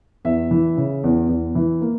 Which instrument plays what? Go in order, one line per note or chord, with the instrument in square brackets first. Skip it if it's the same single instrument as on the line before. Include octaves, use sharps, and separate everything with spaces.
[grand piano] E2 E5
E3
C#3
E2
E2
E3
A#3